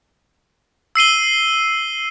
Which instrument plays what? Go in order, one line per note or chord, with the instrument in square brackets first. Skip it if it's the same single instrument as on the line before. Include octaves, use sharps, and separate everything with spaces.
[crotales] E6 C7 D#7 G7